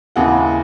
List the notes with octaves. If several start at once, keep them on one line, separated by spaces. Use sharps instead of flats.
D#2 C#3 E3 F#5